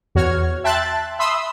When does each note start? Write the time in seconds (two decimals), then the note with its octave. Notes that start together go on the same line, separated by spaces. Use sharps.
0.15 E2 F#4 C#5 F6 G#6
0.64 E5 G5 A5 C6 F#6 A6
1.19 E5 B5 C6 D#6 E6